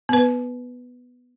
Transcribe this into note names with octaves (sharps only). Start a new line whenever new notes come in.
B3 B4